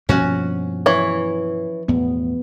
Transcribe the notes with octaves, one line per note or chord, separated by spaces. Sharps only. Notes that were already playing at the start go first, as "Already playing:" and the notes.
G2 B2 F3 A#3 C#4 F#4
E3 C#5
E2 A2 B3